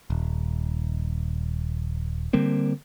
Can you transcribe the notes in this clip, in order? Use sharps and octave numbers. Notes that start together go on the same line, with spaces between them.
D#1
D3 G3 A#3 C4